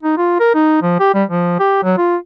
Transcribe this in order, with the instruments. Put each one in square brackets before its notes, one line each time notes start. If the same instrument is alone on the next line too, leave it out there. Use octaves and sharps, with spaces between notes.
[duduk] D#4
F4
A#4
D#4
F3
G4
G3
F3
G4
F#3
F4